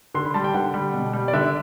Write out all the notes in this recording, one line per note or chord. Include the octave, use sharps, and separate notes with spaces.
D3 C6
B5
G3 A5
G5
D3 F#5
G3
B2
G3
D5
D3 E5